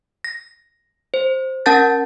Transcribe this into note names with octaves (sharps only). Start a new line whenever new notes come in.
A#6
C5
C#4 A#4 F#5 A5 G6 A6